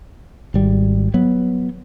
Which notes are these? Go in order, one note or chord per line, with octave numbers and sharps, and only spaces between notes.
G#1 G3
F#3 B3